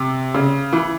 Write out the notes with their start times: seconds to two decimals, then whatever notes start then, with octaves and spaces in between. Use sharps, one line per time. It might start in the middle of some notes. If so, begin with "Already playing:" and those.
Already playing: C3
0.35 C#3
0.73 E3